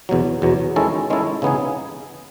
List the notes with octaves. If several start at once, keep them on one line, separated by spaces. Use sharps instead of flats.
E2 B2 F#3
E2 B2 F#3
D#3 G#3 C#4 E4 A4
D#3 G#3 C#4 E4 A4
C#3 E3 B3 D#4 G#4